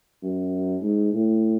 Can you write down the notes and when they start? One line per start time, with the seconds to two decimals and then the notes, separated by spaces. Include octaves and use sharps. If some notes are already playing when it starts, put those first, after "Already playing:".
0.23 F#2
0.82 G#2
1.13 A2